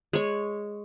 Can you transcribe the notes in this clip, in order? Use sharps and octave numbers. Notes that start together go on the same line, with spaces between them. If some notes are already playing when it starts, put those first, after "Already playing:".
G#3 C#5